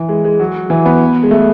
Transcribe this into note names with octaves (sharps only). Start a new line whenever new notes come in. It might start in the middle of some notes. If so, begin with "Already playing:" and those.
Already playing: E3
G#3
G#3
F#3
E3
B3
G#3
A3